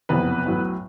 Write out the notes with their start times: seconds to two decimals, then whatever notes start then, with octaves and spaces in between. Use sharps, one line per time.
0.09 F#1 F2 C3 E3 B3 B4
0.45 B1 A2 F#3